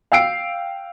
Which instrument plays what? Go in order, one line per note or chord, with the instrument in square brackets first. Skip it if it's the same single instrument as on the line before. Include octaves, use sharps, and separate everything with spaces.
[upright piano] F5 G5 E6 C7 D7